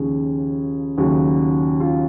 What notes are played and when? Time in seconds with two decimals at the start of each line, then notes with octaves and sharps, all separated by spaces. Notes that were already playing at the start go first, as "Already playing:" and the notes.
Already playing: D#2 C#3 F3 G#4
0.98 D#2 C#3 F#3
1.80 F4